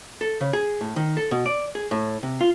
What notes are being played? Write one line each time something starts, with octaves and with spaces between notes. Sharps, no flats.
A4
C#3
G#4
A2
D#3
A4
B2
D5
G#4
A2
C3
F4